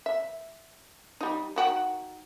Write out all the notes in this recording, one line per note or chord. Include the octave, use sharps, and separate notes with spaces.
E5
G3 D#4
D#3 F#4 G5